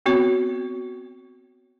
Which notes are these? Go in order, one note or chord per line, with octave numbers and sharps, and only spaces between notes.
B3 C4 F#4 C#5